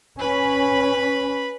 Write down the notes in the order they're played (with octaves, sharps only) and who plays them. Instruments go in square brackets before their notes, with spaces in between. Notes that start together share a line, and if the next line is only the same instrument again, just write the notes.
[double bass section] C#4 [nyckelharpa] B4 B5